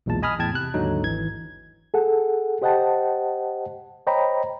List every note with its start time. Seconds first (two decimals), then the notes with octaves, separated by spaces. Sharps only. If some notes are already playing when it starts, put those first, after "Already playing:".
0.06 B1 E2 A#2 G#3 A5
0.23 D#5 G#5 B5 D#6 F6
0.39 E2 A2 G5 A5 G#6
0.53 C3 F#6
0.74 D#2 G#2 D3 F#3 D#4
1.03 G#1 E3 G#6
1.94 G#4 A4 F#5
2.62 G4 C5 D#5 F#5 G5 A5
4.07 C5 C#5 D#5 G5 A#5 B5